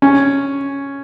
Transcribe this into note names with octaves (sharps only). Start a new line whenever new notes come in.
C#4